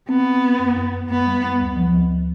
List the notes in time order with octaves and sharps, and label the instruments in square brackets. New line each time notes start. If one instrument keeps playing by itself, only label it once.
[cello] B3 [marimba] C4
[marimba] C4
C4
F#2
F#2
F#2
[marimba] F#2 [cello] B3
[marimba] G3
F#2
D2
F3
D2